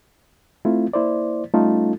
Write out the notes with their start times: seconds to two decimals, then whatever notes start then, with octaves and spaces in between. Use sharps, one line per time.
0.65 A3 C4 E4 F4
0.93 A#3 E4 C5 D5
1.54 G3 A3 C#4 D#4 F4 A4